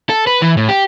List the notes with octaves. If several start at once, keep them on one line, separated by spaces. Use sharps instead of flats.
A4
B4
E3
A2
G4